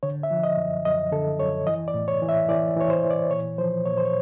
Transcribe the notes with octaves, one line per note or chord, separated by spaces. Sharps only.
D3 C#5
E5
F3
D#5
F#2
F#2 D#5
D3 A4
F#2 C#5
E3 D#5
D5
A2
C#5
E3
E5
E3 D5
E3 C#5
C5
E3
D5
A#2 C#5
F3 C5
A#2 C#5
C5
C#5